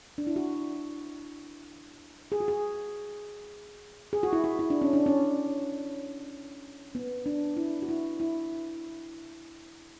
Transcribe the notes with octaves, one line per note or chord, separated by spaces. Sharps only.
D4
E4
F#4
G#4
F#4
G#4
G#4
F#4
E4
F#4
E4
D4
C#4
D4
C#4
B3
D4
E4
F#4
E4
E4